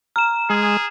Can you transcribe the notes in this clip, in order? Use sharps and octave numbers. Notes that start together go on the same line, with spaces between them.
A#5 F6 E7
G#3 G#4